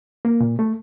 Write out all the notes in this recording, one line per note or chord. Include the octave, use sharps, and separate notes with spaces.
A#3
A#2
A3